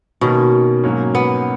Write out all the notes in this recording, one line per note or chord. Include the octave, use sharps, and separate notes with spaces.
B2 D#3 A#3 C#4
G#2 F#3 A#3 C#4
B3